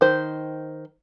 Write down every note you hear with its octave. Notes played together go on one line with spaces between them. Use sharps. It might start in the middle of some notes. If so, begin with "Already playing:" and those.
D#3 C5